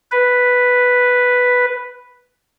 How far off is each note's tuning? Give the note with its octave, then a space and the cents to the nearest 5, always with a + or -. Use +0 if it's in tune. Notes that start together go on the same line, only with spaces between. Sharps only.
B4 +0